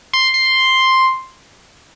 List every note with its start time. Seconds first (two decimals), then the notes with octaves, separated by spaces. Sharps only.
0.13 C6
0.34 C6